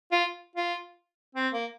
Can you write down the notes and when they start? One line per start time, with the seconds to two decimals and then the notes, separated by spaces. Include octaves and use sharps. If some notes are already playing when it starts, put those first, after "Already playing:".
0.12 F4
0.55 F4
1.35 C4
1.53 A#3